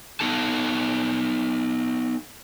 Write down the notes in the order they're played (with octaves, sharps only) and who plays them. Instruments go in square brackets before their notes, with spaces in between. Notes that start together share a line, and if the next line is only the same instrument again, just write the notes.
[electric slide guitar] B3 D#4 A4 A5